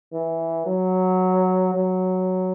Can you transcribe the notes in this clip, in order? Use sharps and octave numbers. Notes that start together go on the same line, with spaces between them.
E3
F#3
F#3